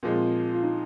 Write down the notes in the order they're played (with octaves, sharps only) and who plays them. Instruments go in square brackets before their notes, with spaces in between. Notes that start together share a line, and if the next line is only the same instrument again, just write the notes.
[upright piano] A#2 F3 G#3 C4 [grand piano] F4
[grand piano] F4
D#4